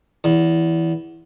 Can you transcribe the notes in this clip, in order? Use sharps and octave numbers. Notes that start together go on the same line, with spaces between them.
E2